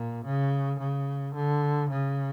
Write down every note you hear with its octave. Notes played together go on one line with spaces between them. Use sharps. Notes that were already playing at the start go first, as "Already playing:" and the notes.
Already playing: A#2
C#3
C#3
D3
C#3